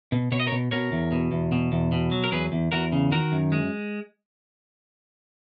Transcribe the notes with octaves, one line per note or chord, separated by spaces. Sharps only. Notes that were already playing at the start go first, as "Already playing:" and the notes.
B2
B2 C#5
D#5
A#4 C#5
B2
B2 A#4 C#5
E2
B2
E2
B2
E2
B2
F#3
A#4
E2 G#4 B4
E2
E2 F#4 A#4
C#3
D#3 F#4 A#4
F#2
G#3